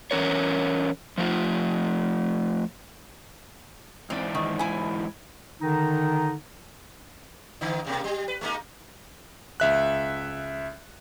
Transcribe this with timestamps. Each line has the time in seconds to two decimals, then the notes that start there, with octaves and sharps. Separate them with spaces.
0.11 E3 C#4 A#4 C#5
1.18 F3 A3 F4
4.10 G#2 E3 C4 D5
4.35 D#3
4.59 E4 G#5
5.62 D3 D#3 D#4
7.61 D3 E3 D#4
7.85 G2 B2 A#3
8.04 G3
8.28 B4
8.41 G#3 A#3 D#4
9.60 C#2 E5 F#6